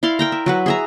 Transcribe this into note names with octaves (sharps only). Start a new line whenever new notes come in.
E4 D5 F5 C6
A#4 G5 A#5
E5
F#3 F#4 B4
G#4 E5 A#5